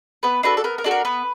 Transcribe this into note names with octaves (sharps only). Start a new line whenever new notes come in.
B3 B4
D4 F#4 A4 B4
A4
B3 A#4
A#4
D4 F#4 A4
A#4
B3 B4